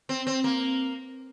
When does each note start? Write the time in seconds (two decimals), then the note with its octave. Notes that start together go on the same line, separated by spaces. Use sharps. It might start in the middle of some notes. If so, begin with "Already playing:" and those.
0.09 C4
0.27 C4
0.44 A#3